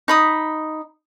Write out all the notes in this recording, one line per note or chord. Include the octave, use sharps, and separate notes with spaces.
D#4 B5 D#6